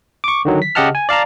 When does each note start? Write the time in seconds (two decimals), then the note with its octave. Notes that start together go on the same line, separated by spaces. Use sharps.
0.24 C#6 D6
0.45 D3 D#3 F#3
0.62 B6
0.75 C#3 G4 D#5 F#5 A5 F6
0.95 G#5
1.09 D5 F5 A5 A#5